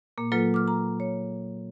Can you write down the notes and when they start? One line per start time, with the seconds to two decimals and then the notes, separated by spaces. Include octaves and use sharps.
0.18 A#2 A#3
0.32 F#3 A#3 F4 A4 B4
0.54 D6 F6
0.68 A#5
1.00 C#5